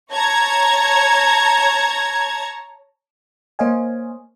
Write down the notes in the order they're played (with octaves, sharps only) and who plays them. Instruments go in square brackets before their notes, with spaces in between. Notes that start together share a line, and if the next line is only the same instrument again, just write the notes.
[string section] C#5 A5 A#5 G#6
[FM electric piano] A#3 C5 C#5 D#5 F5 G#5